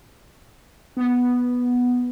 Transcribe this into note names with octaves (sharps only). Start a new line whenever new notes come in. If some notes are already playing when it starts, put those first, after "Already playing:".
B3